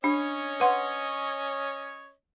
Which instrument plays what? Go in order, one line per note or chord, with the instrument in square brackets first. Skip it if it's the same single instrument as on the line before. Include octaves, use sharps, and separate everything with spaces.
[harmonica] C#4 C#5 D#5 [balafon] D4
[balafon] B4 F#5 C6